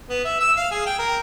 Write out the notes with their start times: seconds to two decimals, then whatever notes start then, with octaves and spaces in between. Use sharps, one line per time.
0.09 B3
0.25 E5
0.40 E6
0.57 F5
0.71 G#4
0.86 G5
0.99 A#4